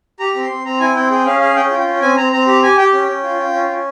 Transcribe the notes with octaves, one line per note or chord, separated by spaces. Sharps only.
G4 A#5
C4
C6
C4
C4 A#5
E4 G#5
C4 G5
G#4 G5
C#4 F5
G#4 F5
C#4 G5
F4
G5
C#4
C4 G#5
C4 A#5
C4 A#5
G4 A#5
G4 G#5
G4 G5
C#4
C#4
F4
F4
C#4
C#4